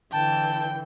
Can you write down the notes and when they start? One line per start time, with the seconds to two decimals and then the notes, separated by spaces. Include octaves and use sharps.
0.12 D3 E3 G5 A5